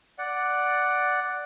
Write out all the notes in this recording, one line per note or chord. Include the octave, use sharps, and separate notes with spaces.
D5 F#5